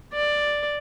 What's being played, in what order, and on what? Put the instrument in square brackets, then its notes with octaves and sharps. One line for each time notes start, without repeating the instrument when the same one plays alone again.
[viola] D5